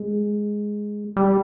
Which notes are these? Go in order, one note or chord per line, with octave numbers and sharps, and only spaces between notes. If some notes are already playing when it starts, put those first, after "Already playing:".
Already playing: G#3
G3